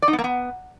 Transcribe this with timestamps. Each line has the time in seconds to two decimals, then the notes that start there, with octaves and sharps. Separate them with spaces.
0.02 D5
0.08 D#4
0.13 B3
0.19 A#3
0.24 B3